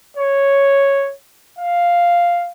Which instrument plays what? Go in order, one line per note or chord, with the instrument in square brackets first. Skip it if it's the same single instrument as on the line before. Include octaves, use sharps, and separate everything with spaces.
[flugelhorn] C#5
F5